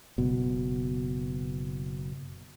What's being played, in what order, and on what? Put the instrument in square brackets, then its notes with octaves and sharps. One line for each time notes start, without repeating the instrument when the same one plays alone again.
[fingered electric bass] F#1 B2